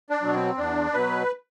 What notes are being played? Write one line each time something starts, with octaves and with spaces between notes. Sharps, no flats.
D4
B2 F#3
C4
E2 D4
B2 F#3 B4